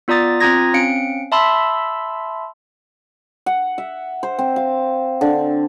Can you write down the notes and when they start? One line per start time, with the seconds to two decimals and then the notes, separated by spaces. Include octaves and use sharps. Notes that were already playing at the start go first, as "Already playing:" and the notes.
0.08 B3 F4 D5 A#5 D#6 A6
0.40 C4 F4 A#5 D#6 G#6 A#6
0.74 C4 C#4 F5 C#7 D7
1.32 E5 A5 B5 C6 E6
3.46 F#5
3.78 E5
4.23 C5
4.39 C4
4.56 F5
5.21 D3